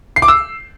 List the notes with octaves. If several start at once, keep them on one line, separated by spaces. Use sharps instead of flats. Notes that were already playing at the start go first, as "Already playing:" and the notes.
C7
D6
E6